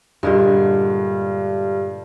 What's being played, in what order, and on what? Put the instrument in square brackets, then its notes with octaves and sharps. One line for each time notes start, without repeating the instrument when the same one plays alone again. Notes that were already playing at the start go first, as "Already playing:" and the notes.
[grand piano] G2 [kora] A#2 D3 G#3